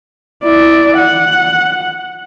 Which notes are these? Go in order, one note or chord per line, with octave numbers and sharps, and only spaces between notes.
E4 D5
F#5